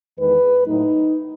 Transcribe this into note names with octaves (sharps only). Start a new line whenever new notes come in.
E2 D#3 G#3 B4
A2 F#3 A3 D#4